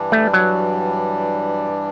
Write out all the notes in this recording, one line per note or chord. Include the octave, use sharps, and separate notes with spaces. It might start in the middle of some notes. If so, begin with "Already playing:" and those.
Already playing: G2 E3 G3 D4
A3
F#3